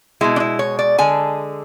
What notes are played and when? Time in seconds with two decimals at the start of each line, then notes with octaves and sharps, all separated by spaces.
0.21 B2 G#3 E4
0.36 D4
0.40 E4
0.59 C#5
0.79 D5
0.98 D3 G#3 G#5